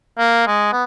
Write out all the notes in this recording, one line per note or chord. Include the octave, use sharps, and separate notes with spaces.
A#3
G#3
B3